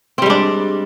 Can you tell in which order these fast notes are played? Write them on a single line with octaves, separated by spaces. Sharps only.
C4 G3 G#3 D4